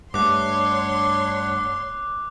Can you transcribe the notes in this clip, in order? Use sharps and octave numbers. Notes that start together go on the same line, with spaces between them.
G2 A3 D4 C#5 F#5 C6 D6 F#6